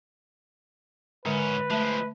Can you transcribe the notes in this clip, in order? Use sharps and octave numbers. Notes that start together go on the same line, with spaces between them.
G#2 D3 G#3 C#4 B4
F3 G#3 A3 E5 A5